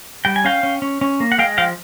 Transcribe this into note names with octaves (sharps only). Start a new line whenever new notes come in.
G3 G5
G#5
C#4 F5 G5
C#4
C#4
C#4
A#3
F#5
G#3 F5 G5
F3 F5 G5